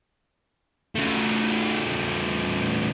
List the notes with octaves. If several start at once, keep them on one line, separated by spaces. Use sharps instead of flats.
C#3 A3